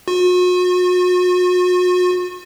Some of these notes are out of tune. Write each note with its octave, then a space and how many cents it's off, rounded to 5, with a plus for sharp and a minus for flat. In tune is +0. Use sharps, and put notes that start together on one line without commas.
F#4 -40